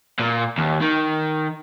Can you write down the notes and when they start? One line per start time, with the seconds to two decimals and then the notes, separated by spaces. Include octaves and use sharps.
0.19 A#2
0.58 D#2
0.81 D#3